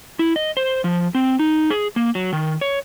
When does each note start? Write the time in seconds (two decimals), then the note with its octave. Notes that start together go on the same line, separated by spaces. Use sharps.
0.19 E4
0.36 D#5
0.57 C5
0.84 F3
1.15 C4
1.39 D#4
1.70 G#4
1.96 A#3
2.15 F#3
2.33 D#3
2.61 C#5